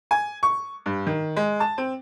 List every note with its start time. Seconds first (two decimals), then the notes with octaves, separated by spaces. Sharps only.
0.11 G#5
0.43 C#6
0.86 G2
1.07 D#3
1.36 G#3
1.60 A5
1.78 C4